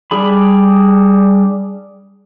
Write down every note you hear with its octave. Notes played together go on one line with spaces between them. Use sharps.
G3 D4 G#4 B5